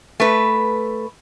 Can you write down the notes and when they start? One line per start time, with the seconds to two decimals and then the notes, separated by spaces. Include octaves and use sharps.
0.20 A3 B4